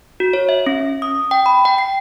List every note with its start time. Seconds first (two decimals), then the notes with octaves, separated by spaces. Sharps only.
0.20 F#4
0.33 C#5
0.49 E5
0.66 C#4
1.02 D#6
1.31 G5
1.46 B5
1.65 G5
1.78 C7